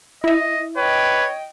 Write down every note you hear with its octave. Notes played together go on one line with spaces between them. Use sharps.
E4 D#5 E5
B4 C#5 D#5 G5